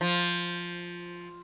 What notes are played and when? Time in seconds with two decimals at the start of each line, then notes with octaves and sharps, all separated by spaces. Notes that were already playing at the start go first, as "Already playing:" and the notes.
0.01 F3